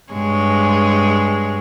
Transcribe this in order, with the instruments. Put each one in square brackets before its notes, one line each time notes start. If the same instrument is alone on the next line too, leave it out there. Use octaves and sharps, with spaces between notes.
[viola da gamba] G2 G#3 C#5